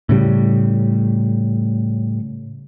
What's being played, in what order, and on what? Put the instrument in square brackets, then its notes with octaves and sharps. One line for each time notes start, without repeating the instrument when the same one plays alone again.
[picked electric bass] A2 C#3 G3